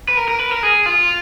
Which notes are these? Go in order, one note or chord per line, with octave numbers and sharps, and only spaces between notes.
B4
A#4
A#4
B4
A#4
G#4
F4